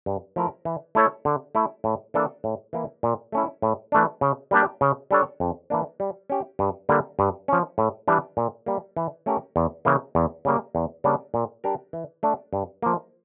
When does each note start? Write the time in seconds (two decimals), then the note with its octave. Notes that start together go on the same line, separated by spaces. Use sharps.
0.06 G2
0.36 F3 A3 E4 A#4
0.65 E3
0.95 A3 E4 A4 C#5
1.25 D3
1.55 A3 E4
1.84 A2
2.14 E3 A#3 D4 A4
2.44 A2
2.73 E3 A#3 E4
3.03 A#2
3.32 A3 C#4 E4
3.62 A2
3.92 E3 A3 D4
4.21 C#3
4.51 G3 A#3 D4 G4
4.81 C#3
5.11 G3 D4 A4 C#5
5.40 F2
5.70 E3 A#3 D4
6.00 G3
6.30 C#4 G4
6.59 G2
6.89 D3 G3 A#3
7.19 G2
7.48 F3 C#4
7.78 A2
8.08 E3 G3 D4 G4
8.37 A#2
8.66 G3 A#3
8.97 E3
9.26 A3 C#4 G4 A#4
9.56 E2
9.85 C#3 E3 A#3
10.15 E2
10.45 C#3 G3 A#3
10.75 E2
11.04 C#3 G3 A#3 D4
11.34 A#2
11.64 G3 D4 G4 A#4
11.93 E3
12.23 A3 D4
12.53 G2
12.82 F3 A#3